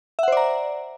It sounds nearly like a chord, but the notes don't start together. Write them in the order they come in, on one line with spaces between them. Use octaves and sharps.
E5 F#5 C5 D5 A#5